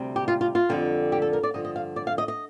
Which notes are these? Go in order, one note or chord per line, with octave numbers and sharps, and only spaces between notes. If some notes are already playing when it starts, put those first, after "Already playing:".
Already playing: D2 C3 G3
G4
F4
F4
F4
F2 D3 G3
G4
A4
A#4
D5
G2 D3 F3 D#5
D#5
F5
D5
F5
D#5
D#5